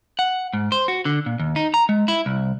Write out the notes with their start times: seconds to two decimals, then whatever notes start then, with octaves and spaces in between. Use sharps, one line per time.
0.19 F#5
0.54 G#2
0.72 C5
0.88 F#4
1.05 D3
1.26 A#2
1.40 D#2
1.56 D#4
1.74 A#5
1.89 G#3
2.08 E4
2.26 C2